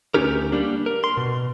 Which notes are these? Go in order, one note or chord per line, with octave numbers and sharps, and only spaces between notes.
D2 C#3 C#4 D#4 G4 A#4
G3 A#3 D4
A#4
C6
B2